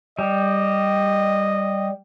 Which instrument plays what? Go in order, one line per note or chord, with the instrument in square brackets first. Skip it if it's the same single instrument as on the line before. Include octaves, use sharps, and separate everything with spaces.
[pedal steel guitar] G3 [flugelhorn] D#5